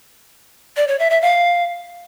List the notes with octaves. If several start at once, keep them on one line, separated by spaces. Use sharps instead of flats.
D5
C#5
E5
E5
F5